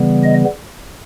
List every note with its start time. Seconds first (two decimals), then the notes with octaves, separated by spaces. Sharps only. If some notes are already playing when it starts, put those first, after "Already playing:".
Already playing: C#3 E3 G3 B3
0.24 D#5